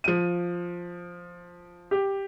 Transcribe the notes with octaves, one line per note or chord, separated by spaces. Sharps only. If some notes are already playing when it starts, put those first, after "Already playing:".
F3 D#7
G4